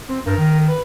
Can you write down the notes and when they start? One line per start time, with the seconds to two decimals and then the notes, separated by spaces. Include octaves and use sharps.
0.08 C4
0.25 G2 A#4
0.37 D#3
0.67 B4